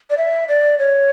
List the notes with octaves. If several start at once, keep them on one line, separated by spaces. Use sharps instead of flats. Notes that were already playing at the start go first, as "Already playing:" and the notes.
D5
E5
D5
C#5